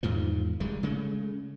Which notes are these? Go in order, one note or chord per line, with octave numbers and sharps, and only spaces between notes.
E2 G#2 D#3 F3
F1 G3 G#3
C#3 G#3 A3